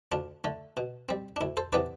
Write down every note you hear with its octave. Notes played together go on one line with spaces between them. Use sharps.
D2 D4 F4
D3 A3
B2
G3 C4
D4
D2 E4
A4 C5
C3 E3 B3 D4 B4 D5